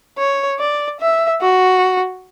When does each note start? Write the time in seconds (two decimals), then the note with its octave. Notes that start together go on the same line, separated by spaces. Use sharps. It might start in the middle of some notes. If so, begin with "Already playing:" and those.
0.18 C#5
0.59 D5
1.00 E5
1.41 F#4